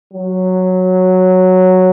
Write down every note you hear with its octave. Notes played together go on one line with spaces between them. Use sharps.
F#3